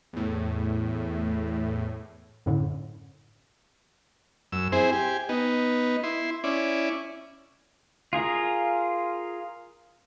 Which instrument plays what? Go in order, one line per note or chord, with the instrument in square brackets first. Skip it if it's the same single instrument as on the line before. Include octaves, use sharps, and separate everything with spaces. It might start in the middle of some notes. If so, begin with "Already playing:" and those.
[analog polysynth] E2 A2
[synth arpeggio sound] F#2 A2 D3
[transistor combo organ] F#2 E6
C4 E4 G#4 C5
G4 G#5
B3 D#4
E4 C6
C#4 E4 D5
[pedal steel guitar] F4 G#4 A#4